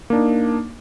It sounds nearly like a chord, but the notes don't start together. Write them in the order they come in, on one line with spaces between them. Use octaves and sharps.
A#3 D4 D#4